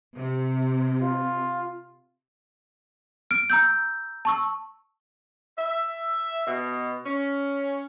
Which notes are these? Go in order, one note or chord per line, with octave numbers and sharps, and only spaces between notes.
C3
F4
F6 D7
A#5 E6 G6
A5 C#6 E6
E5
B2
C#4